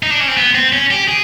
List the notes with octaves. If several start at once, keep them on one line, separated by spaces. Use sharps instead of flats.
D#4
D4
C#4
C4
B3
C4
C#4
G4
G#4